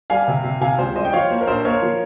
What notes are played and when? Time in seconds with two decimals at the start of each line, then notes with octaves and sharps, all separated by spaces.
0.10 G3 F5 G#5
0.28 C3
0.44 C3
0.61 C3 F5 G#5
0.78 C#2 C5
0.96 G3 C5 D#5
1.05 G5
1.13 F3 C#5 F5
1.30 A#3 C5
1.41 A#4
1.47 A#1 C5
1.65 A#3 A#4 C#5
1.82 F3